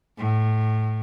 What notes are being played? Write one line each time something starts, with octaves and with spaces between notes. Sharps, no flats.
A2